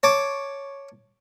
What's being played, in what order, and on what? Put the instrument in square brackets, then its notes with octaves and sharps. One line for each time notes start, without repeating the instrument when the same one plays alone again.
[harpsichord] C#5 A5 D6